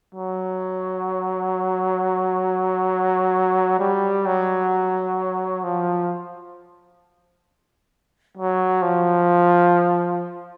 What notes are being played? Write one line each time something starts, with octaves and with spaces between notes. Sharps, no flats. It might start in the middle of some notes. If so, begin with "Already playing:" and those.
F#3
G3
F#3
F3
F#3
F3